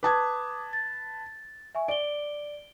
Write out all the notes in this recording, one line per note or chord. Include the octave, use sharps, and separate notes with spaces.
B4 A5 D6 D#6 G#6
A6
E5 G#5 C#6
D5 D7 G7